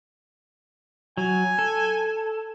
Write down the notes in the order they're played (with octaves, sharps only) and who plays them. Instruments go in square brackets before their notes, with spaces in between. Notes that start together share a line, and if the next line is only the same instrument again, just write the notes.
[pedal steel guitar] F#3 [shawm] G#5
[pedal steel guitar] A4